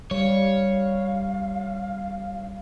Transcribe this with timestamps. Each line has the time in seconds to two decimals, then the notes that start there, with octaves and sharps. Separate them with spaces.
0.11 G3 C#5 F5